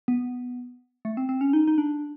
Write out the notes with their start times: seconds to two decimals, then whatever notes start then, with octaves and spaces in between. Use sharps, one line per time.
0.08 B3
1.05 A3
1.17 C4
1.29 C4
1.41 C#4
1.53 D#4
1.67 D#4
1.78 D4